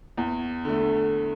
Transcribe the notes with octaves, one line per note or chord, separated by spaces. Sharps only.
E2
D3 A3